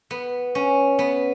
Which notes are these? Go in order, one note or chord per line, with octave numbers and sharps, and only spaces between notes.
B3
C#4
B3